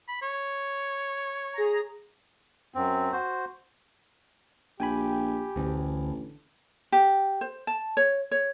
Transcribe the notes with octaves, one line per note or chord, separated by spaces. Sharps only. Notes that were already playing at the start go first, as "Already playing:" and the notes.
B5
C#5
G#4 A#5
F#2 C4
F#4 C5
A#1 G4 G5 G#5 B5
A1 D2
G4
C5
A5
C#5
C#5